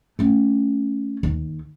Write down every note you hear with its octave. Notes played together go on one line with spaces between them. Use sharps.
A3 C#4
D#2